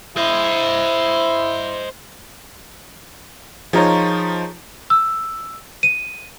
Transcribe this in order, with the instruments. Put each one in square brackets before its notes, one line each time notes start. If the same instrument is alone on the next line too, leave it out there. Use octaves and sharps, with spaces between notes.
[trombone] E4 [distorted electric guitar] C5 D#5
[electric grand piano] F3 D#4 F4 [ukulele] G#4 A#4 C#5
[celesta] E6
D#7